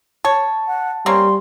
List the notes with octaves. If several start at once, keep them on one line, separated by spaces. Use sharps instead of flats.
C#5 A5
F#5
G3 A#3 C4 C#4 C6